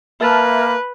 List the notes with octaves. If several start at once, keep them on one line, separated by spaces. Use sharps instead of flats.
A#3 B4 E5 A5 F6